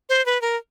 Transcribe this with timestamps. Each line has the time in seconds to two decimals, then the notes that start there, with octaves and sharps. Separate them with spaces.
0.09 C5
0.26 B4
0.42 A#4